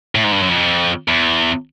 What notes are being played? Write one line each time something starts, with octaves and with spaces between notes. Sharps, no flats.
A2
G#2
G2
F#2
F2
E2